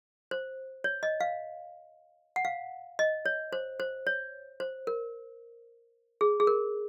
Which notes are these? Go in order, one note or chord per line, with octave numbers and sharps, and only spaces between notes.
C5
C#5
D#5
F5
F#5
F5
D#5
C#5
C5
C5
C#5
C5
A#4
G#4
G#4
A#4